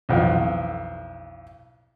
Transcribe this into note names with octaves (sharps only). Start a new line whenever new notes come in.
B1 F2 E3